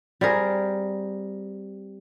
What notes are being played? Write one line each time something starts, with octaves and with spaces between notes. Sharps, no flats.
G3 C4 G#4 A#4